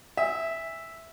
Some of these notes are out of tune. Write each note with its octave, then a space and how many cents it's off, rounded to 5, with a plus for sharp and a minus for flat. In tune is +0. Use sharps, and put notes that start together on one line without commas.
E5 +0 G#5 -35 D#6 +45